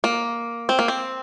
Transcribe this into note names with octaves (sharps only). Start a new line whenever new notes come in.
A#3
C4
A#3
C4